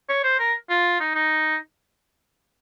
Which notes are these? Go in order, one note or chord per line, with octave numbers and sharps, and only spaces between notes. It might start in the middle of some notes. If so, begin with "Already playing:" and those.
C#5
C5
A#4
F4
D#4
D#4